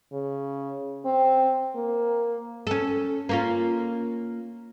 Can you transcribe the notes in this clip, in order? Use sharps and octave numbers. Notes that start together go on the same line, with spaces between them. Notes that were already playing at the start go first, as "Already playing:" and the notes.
C#3
C4
A#3
C#4 A4
A#3 C#4 F4